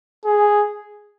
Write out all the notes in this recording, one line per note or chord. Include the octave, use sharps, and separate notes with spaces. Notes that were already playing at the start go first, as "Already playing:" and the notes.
G#4